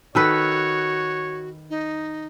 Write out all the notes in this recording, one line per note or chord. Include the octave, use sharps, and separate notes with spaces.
D#3 F#4 A4 B4 C#5
D#4